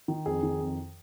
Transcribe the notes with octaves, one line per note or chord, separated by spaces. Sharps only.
D#3
F2 G#4
D#3
F2